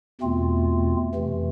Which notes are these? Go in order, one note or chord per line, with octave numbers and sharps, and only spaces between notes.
E2 B2 A3 C4 F4
F2 C3 E3 A3